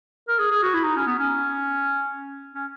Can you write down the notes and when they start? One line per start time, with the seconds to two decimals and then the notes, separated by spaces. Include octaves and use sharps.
0.28 A#4
0.38 G#4
0.51 G#4
0.62 F#4
0.74 E4
0.84 D#4
0.96 C#4
1.07 B3
1.19 C#4
2.54 C#4